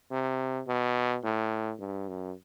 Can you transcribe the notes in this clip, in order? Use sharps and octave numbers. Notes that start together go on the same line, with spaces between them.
C3
B2
A2
G2
F#2